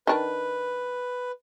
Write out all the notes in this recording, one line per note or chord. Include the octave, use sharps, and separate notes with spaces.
D#3 D4 A#4 B4